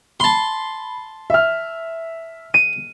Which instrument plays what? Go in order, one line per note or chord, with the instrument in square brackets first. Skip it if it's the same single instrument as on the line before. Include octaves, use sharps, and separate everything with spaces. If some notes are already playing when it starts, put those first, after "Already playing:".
[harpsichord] A5 C6 [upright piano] B5
[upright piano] E5 F6
[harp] D#7